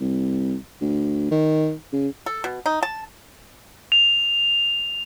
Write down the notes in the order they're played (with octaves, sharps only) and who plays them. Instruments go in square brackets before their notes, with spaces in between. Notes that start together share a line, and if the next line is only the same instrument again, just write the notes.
[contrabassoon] C2
D2
D#3
C#3
[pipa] A4
B2
D#4
A5
[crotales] F7